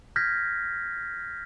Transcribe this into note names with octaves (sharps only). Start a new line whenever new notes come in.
F6 G6 G#6 A#6 B6